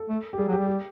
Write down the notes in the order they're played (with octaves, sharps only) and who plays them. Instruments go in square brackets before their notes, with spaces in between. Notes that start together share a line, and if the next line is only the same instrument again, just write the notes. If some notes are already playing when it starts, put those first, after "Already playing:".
Already playing: [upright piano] A4
[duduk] A3
[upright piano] G4
[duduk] G3 [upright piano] G#4
[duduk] F#3
[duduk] G3 [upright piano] G4
[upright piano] G4